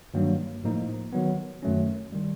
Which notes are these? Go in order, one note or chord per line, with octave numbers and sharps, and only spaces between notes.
G2 D#3 F#3 A#3
A2 F3 A#3 D#4
D#3 F#3 B3
F#2 D#3 F#3 A3 C#4
D#3 G3